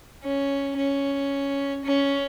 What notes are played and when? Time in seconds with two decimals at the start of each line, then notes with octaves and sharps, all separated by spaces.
0.23 C#4
0.77 C#4
1.85 C#4